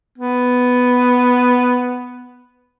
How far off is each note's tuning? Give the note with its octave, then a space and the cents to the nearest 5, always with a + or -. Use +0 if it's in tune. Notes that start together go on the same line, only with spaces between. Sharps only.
B3 +5